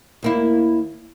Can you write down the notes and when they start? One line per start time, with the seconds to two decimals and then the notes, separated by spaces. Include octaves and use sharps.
0.23 D#2 A#3 E4